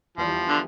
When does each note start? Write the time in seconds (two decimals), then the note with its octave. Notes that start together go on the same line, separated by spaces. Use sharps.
0.18 E2 E3 F3 G3
0.49 D3